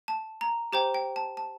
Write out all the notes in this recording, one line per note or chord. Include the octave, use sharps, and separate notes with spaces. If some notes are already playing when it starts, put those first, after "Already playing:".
A5
A#5
G4 C5 G5 A#5
G5
A5
A5